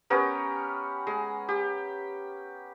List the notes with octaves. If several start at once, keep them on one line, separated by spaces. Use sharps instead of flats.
B3 C#4 G4 A#4
G#3
G4